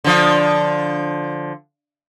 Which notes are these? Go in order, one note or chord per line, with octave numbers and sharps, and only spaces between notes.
D3 F3